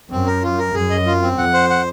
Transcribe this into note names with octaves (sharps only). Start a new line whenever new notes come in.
F#2 C4
A#4
F4
A#4
F#2 G#4
D#5
F4
C4
F2 F#5
C5
F#5